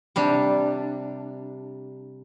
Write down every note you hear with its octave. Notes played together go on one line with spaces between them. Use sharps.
C3 G3 D4